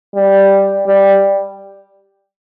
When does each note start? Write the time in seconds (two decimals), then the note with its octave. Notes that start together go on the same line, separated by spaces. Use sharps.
0.15 G3
0.86 G3